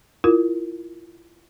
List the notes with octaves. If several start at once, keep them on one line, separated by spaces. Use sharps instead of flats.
E4 F4 A#4